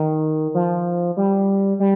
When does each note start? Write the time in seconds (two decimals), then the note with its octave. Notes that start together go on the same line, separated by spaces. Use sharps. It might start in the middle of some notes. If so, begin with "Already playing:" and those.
Already playing: D#3
0.54 F3
1.17 G3
1.80 G3